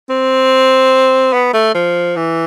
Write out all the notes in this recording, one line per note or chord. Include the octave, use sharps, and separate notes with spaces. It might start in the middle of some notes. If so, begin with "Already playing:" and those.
C4
B3
A3
F3
E3